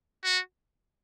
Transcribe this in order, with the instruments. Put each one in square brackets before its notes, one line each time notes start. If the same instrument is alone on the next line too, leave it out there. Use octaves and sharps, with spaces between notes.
[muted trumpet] F#4